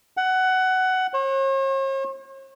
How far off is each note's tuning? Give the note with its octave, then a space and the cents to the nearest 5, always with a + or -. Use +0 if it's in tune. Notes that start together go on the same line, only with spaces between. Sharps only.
F#5 +15
C#5 -45